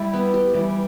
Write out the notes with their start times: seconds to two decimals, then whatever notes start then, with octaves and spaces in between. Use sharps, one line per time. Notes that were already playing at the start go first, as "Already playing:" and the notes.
Already playing: G3 E4 D5
0.13 B3
0.34 G4
0.55 E3 G3